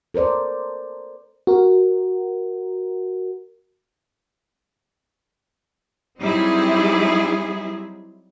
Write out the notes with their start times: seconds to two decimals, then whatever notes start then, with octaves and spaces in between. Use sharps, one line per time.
0.14 A4 A#4 C5 D5
1.47 F#4 A#4
6.20 F#3 G3 C4 D#4 E4 G#4